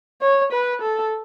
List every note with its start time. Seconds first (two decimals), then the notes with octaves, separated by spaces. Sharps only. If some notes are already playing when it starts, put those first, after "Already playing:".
0.21 C#5
0.52 B4
0.82 A4